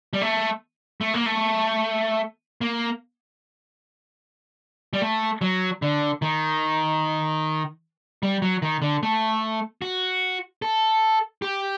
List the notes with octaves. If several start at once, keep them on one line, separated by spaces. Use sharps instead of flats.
G3
A3
A3
A#3
A3
A#3
G3
A3
F#3
D3
D#3
G3
F#3
D#3
D3
A3
F#4
A4
G4